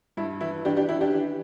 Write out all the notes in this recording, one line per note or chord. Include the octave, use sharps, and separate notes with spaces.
G2 E4
E3 E4
E3 D4 G4
D4 G4
E3 E4
D4 G4
E3